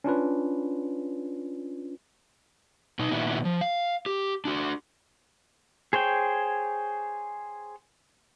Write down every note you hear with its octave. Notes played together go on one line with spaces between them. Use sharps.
C#4 D4 F4 B4
B2 D#4
A#2 D#3 B3 E4 F#4
F3
F5
G4
D4 F#4
G#4 C5 C#5 G5